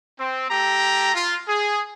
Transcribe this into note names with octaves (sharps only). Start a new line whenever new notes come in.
C4
A3 G4 A#5
F4
G#4